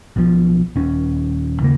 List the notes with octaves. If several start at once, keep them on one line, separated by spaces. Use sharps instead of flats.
B1 B2 E3 F3
D#1 C#4
D#2 C#3 A#3